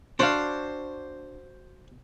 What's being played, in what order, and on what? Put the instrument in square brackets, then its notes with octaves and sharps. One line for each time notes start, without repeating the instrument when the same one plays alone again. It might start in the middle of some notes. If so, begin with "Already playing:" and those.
[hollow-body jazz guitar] D4 [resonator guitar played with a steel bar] F#4 F5 [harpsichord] C5